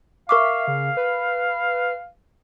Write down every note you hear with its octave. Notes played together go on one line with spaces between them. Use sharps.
A#4 E5 F5 C#6 D6
C#3
B4